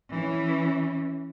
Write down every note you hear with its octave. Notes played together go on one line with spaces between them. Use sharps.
E3 C#4